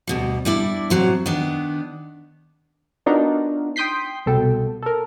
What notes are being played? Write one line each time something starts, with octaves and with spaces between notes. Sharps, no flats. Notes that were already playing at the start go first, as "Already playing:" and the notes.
D2 B2 G3
G3 D4 E4 D5
A2 C3 F#3 C5
D#3 B3 D4
B3 D4 D#4 F4 F#4 A#4
G5 C6 D#6 G6 B6 C7
C2 B2 A4 G5
A4 A#4